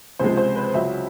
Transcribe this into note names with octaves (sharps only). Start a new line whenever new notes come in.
C#2 C3 F3 G#3 C5
C5
B4
C#2 C#3 F#3 E5